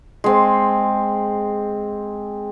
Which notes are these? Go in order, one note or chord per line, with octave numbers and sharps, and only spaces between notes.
G#3 C4